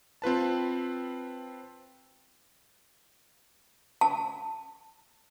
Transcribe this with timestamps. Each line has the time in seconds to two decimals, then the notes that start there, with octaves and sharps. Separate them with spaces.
0.22 C4 F4 B4 A5
4.01 A5